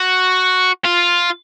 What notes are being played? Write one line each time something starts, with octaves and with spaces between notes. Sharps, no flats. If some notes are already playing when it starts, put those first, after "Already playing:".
Already playing: F#4
F4